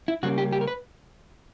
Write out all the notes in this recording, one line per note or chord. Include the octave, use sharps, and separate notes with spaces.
E4
C#3 G3 A#3 C#4 F#4
G4
G4
A#4
B4